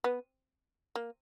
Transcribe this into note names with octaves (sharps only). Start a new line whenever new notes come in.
B3
A#3